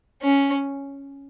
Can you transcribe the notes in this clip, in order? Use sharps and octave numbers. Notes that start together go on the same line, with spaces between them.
C#4